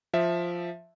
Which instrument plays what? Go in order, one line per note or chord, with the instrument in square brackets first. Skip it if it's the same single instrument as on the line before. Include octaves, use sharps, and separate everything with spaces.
[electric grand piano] F3 E5